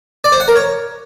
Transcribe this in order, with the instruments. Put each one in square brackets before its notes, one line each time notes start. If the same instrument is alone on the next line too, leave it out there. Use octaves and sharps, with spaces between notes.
[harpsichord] D5
C5
F#5
A#4
C#5